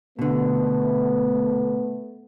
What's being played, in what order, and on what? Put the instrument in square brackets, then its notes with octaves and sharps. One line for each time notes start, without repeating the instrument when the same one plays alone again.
[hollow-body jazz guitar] B2 D3 [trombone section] A3 B3